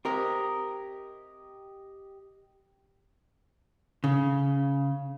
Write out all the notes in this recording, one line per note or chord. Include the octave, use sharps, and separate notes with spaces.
C4 G4 A#4 D#5
C#3